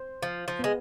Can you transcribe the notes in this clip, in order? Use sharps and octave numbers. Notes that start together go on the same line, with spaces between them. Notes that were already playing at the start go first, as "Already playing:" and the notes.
Already playing: C5
F3 F5
F3
G#3 B3